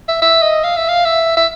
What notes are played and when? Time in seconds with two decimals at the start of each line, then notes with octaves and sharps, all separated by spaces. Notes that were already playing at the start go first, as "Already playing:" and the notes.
0.08 E5
0.22 E5
0.43 D#5
0.64 F5
0.76 E5
0.88 F5
1.05 E5
1.37 E5